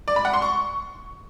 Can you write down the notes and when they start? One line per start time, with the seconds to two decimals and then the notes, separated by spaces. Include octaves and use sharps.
0.08 D5
0.16 B5
0.25 F#5
0.33 C6
0.42 C#6